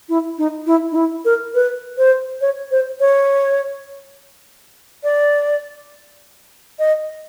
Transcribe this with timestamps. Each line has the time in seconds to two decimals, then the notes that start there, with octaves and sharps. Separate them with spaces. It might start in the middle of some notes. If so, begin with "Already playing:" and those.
0.09 E4
0.38 D#4
0.67 E4
0.92 D#4
0.95 E4
1.25 A#4
1.55 B4
1.98 C5
2.41 C#5
2.71 C5
3.00 C#5
5.04 D5
6.79 D#5